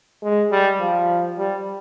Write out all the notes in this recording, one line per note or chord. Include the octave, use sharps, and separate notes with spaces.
G#3
G3
F3
G3